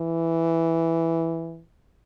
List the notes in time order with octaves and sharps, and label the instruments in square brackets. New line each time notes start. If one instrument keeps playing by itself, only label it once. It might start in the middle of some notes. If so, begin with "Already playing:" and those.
Already playing: [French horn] E3